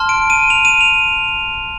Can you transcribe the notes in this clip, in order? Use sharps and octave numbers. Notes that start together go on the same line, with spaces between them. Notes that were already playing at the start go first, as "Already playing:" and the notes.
Already playing: A5 C6 F6
D7
D#7
F7
D#7
F7